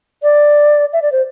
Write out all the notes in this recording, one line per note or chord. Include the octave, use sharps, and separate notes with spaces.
D5
E5
D5
C5